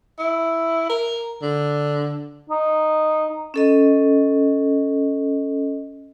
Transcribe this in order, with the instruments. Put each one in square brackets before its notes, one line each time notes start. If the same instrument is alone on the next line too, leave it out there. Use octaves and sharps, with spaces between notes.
[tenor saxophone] E4
A#4
D3
[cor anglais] D#4
[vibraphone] C#4 A4 D#5